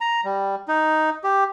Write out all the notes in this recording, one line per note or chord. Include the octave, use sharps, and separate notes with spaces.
A#5
G3
D#4
G4